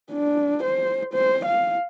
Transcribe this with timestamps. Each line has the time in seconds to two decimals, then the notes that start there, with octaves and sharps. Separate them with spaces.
0.12 D4
0.63 C5
1.13 C5
1.45 F5